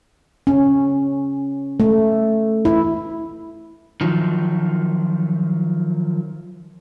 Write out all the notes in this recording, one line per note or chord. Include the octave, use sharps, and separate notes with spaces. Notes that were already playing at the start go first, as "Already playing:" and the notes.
C#4
A3
E4
D#3 F3 F#3